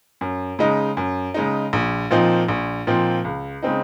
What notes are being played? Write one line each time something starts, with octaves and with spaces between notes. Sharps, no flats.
F#2
C#3 G#3 D#4
F#2
C#3 G#3 D#4
A#1
A#2 F3 C4 D#4
A#1
A#2 F3 C4 D#4
C#2
C#3 G#3 C4 D#4